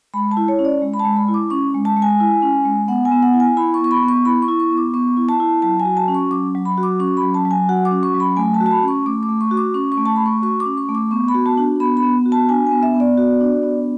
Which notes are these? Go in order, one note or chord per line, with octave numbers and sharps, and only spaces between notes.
G#3 B5
A5
E4
C#5
C#4
D5
G#3
B5
A5
G#3
B5
E4
D6
C#4 C#6
G#3
A5
G#3
G#5
E4
C#4
G#3
B3 F#5
G#5
B3
F#5
E4
G#5
E4 B5
C#6
B3
C#6
B5
B3
C#6
E4 B5
C#6
E4
C#6
B3
D6
B3 C#6
E4
A5
E4
F#3 A5
G#5
F#4
A5
C#4
C#6
F#3 D6
F#3
B5
F#4
D6
C#4 C#6
B5
F#3
A5
F#3
G#5
F#4 F#5
D6
C#4
C#6
F#3
B5
A3 G#5
A5
F#4
A5
B5
C#4 C#6
A3 D6
D6
A3
C#6
F#4
D6
C#4 C#6
C#6
A3
A5
A3 B5
C#6
F#4 C#6
D6
C#4
C#6
A3
D6
B3 C#6
B5
F#4
A5
D4
B3 B5
B5
B3
F#4
A5
D4 G#5
G#5
B3
E5
B3
D5
F#4
D4
B3